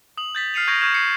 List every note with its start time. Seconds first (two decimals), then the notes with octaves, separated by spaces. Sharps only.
0.17 D#6 F#7
0.35 G6 A6 B6
0.54 F6 C7 C#7 D#7 F7
0.68 C#6 G6 G#6 A#6 D7 F7
0.81 C#6 F6 G6 G#6 E7
0.94 C7 C#7